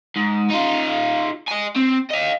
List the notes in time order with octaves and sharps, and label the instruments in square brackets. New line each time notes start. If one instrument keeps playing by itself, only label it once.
[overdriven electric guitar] G#2
D#4 F4
D#5 G#5
C4
D#5 F5